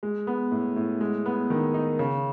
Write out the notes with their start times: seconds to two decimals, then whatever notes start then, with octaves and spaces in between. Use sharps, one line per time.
0.03 G#3
0.27 B3
0.52 A2
0.76 A2
1.01 G#3
1.26 B3
1.50 D#3
1.74 D#4
1.99 C#3